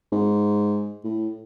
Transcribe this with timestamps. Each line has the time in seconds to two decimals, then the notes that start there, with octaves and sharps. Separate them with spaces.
0.12 G#2
1.04 A2